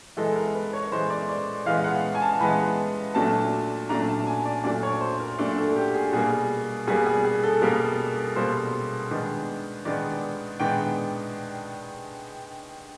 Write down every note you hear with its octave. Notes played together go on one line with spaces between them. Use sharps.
E3 G#3 B3 A4
A#4
B4
C#5
E3 G#3 B3 C5
D5
D5
E3 G#3 B3 F5
F#5
G#5
A5
E3 G#3 B3 B5
A#2 F#3 A3 D4 A5
A#2 F#3 A3 D4 A#5
A5
G#5
D5
A#2 F#3 A3 D4 D5
C#5
C5
A#4
A#2 F#3 A3 D4 A4
A4
G4
G#4
B2 G3 A#3 G#4
B2 G3 A#3 G#4
G#4
G#4
A4
B2 G3 A#3 A#4
B2 G3 A#3 C5
D#3 G#3 B3 D4
D#3 G#3 B3 D4 D5
D#3 G#3 B3 D4 G5